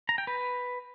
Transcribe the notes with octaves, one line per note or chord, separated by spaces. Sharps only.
A#5
G5
B4